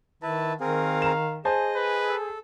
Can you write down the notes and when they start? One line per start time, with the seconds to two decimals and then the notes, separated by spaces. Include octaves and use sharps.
0.23 D#3 E4 B4 A5
0.60 D#3 C4 G#4 A#4 F5
1.02 A#5 E7
1.45 G#4 C5 D#5 G#5 A5
1.76 B4
2.09 A4